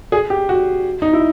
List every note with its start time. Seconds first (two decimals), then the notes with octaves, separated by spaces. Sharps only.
0.12 G#4
0.30 G4
0.49 F#4
1.02 D#4
1.13 E4